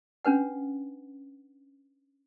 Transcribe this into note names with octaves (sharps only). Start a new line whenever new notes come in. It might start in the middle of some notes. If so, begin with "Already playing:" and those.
C#4 D4 B4 F#5